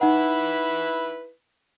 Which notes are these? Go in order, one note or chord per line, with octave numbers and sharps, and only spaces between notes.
D#4 E4 B4 F#5